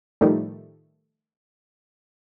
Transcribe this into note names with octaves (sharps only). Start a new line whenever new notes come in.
A2 D#3 F3 G3 A3